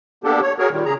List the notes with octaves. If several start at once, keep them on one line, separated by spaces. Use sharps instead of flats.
A#3 B3 D4 G4 A4
C#5
F#4 G#4 A#4 C#5
A#2 D#3 G3
C#3 G#4 A#5